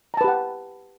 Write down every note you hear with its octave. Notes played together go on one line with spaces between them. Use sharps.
G4 B4 F#5 A5 A#5